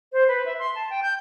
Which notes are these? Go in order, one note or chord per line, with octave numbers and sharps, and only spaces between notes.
C5
B4
E5
C6
A5
G5
G6